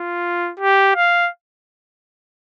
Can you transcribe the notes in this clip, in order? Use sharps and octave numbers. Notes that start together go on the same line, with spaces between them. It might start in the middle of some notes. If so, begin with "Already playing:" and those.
Already playing: F4
G4
F5